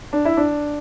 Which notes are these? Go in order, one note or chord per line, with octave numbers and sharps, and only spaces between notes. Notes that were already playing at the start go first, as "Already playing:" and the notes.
D4
E4
D4